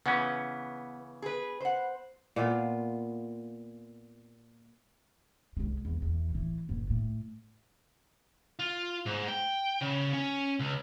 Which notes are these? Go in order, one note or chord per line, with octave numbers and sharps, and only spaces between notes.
C#3 E3 B3 C#4
G#4 B4
C5 F#5
A#2 B3 F4
C2 G#3
E2
E2 E3
A2 E3
F#1 A2
A2
F4
G#2
G5
C#3
C#4
C#2